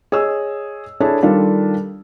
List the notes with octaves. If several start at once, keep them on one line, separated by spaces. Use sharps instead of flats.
G#4 C#5 D#5 E6
D4 E4 G#4 A4 C#5 A5
D#3 G3 D4 F4 A4